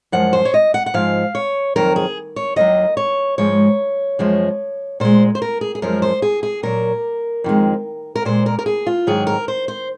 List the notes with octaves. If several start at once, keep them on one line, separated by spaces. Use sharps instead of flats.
F#2 F3 G#3 F#5
C5
C#5
D#5
F#5
F#5
G#2 F3 G#3 F5
C#5
F2 D#3 F#3 A#4
G#4
C#5
D#2 D#3 F#3 D#5
C#5
G#2 F3 G#3 C#5
F#2 F3 G#3
A#2 G#3 C5
C5
A#4
G#4
G#4
F#2 F3 G#3 A#4
C5
G#4
G#4
A#2 F#3 A#4
F2 D#3 G#3
A#4
A#2 G#3 C5
A#4
A#4
G#4
F4
G#2 D#3 F#3 G#4
A#4
C5
C5